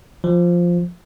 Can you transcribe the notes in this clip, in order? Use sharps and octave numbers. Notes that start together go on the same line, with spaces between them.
F3